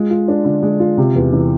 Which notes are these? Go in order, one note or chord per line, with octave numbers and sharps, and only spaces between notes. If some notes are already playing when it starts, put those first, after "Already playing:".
Already playing: G#3 F4
F4
D4
D3
G#3
F4
C3
E2
E3